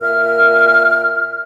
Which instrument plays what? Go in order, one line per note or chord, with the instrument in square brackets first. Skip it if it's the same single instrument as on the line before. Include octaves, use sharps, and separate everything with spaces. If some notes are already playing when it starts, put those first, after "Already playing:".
[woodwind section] A#2 A#4 E5 F6